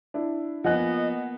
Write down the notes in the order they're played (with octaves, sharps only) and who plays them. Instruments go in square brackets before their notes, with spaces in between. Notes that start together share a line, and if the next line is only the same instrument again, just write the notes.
[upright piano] D4 E4
[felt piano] F3 [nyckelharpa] A#3 B3 [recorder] D#5 [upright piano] F#5 G#5 F#6